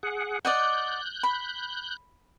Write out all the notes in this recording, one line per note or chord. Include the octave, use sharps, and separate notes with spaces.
G#4 F#5
D5 D#5 F#5 F#6 G6
B5